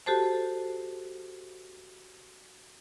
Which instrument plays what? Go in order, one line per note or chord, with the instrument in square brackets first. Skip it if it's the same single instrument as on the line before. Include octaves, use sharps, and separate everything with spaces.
[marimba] F#4 G4 A4 C5 A5